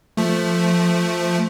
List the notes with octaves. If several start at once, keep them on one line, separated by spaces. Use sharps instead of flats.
F3 A3